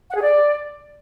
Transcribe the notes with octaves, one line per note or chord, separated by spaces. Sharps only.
F#5
G#4
D5